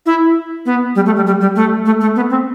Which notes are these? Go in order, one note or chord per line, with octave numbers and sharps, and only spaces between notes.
E4
B3
G3
A3
G3
G3
G3
A3
A3
A3
B3
C4